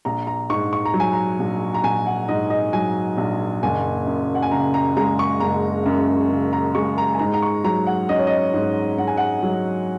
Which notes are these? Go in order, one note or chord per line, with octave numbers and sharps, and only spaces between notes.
A#1 A#5
A#5
G#2 C#6
C#6
A#5
F#3
G#5
A#5
A#1
A#5
A#1 G#5
F#5
G#2 D#5
D#5
F#3 G#5
A#1
F#1 G#5
F#2
F#5
G#5
C#3 A#5
A#5
G#3 A#5
C#6
F#1 A#5
F#2
C#3
A#5
G#3 C#6
A#5
G#5
G#2 A#5
A#5
C#6
F#3 A#5
F#5
C#4 D#5
C#5
D#5
G#2
G#2 F#5
G#5
F#5
F#3